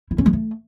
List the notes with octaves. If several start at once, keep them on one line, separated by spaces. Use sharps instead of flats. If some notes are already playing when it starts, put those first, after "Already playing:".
E4
C#4
G#3
A3